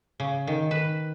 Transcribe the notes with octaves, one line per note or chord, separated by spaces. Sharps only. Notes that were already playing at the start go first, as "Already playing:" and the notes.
C#3
D#3
B4